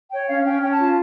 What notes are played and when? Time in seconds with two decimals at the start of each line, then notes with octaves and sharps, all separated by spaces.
0.10 C#5 G5
0.27 C#4 F5
0.45 C#4 G5
0.62 C#4 G5
0.70 A5
0.78 F4